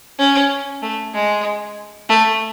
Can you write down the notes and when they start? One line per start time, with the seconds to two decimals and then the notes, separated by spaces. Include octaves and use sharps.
0.19 C#4
0.82 A3
1.14 G#3
2.09 A3